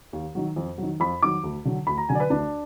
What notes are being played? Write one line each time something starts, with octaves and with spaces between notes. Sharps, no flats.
D#2
D#3 F#3
F2
D#3 F#3
F2 B5
D#3 F#3 D6
D2
D3 F#3
D2 B5
A#5
D3 F#3 G#5
D5
B4
D2 D4